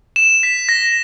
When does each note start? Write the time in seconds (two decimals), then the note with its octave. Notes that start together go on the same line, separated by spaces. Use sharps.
0.16 E7
0.43 B6
0.69 A#6